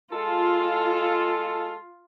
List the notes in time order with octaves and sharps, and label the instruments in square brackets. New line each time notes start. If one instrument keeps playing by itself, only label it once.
[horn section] G#3 A4 [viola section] F4